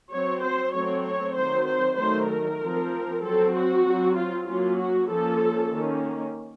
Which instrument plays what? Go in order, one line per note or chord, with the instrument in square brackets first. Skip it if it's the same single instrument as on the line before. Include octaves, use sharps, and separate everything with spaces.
[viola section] F#3 C4 C#5
C5
F#3 A3 C4 C#5
C#5
D#3 F#3 C4 C5
C5
D#3 F#3 A3 C5
A#4
F3 C4
F#3 C4 A4
F#4
F#3 C4
F4
F#3 A#3 C#4 F4
F#4
F3 A#3 C#4 A4
D#3 A#3 C#4